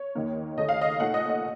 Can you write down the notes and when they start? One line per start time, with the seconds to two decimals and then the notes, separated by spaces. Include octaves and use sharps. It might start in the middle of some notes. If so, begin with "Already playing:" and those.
Already playing: C#5
0.15 D#2 D#3 A#3 D#4
0.57 D#2 C#3 A3 D#4 D#5
0.69 F5
0.81 D#5
1.00 A#2 A3 D#4 F#5
1.14 D#5
1.29 D#5